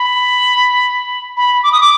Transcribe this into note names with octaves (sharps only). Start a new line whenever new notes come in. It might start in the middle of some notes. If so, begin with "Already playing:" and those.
Already playing: B5
B5
D6
D#6
D6